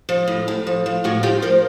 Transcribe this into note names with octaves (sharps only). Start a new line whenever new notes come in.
F3
A2
A2
F3
F3
A2 F#4 G#4
F3 F4 G4
F3 A#4 C5